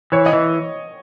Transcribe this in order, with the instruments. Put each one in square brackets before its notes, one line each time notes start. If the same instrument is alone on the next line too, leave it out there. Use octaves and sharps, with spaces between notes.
[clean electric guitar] E3 [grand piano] C#5
[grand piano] D#5
[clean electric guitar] E3